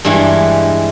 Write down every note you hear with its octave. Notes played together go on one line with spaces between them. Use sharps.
G2 E3 G3 G#3